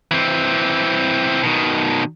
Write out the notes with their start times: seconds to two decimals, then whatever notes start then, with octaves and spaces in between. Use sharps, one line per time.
0.11 E3 C4
1.43 B2 D#3